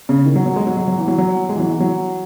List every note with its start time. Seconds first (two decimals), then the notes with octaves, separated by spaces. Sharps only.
0.09 C#3
0.25 D#3
0.36 F#3
0.46 F#3
0.56 G#3
0.67 F#3
0.77 F#3
0.88 F#3
0.98 E3
1.08 F#3
1.18 F#3
1.49 G#3
1.56 E3
1.59 F#3
1.70 E3
1.80 F#3